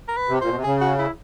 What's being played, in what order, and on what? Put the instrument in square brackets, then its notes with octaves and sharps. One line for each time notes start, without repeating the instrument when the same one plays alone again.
[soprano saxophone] A#4
B4
[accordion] C3
[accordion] A#2 [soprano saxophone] C5
[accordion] B2
C3
[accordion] C#3 [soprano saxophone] G#4
[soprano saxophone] F#4
E4